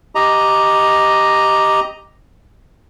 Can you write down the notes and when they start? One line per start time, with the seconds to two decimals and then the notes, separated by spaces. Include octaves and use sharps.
0.15 G4 D#5 A#5